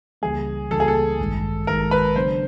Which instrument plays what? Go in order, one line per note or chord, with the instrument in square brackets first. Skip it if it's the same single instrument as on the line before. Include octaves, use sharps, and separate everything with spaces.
[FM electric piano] C#2 C#3 E3 G3 A#3 [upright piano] G#4
[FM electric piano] C#2 C#3 E3 G3 A#3 [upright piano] A4
[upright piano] G#4
A4
[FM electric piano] A1 G2 D#3 G#3
[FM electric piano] A1 G2 D#3 G#3 [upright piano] A#4
[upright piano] B4
[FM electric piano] C#3 F#3 B3 D4 [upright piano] C5